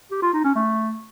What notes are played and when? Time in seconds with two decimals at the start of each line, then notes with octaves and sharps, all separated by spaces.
0.11 G4
0.22 F4
0.33 D#4
0.44 C#4
0.55 A3